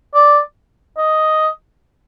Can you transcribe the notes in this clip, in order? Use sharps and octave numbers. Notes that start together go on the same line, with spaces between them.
D5
D#5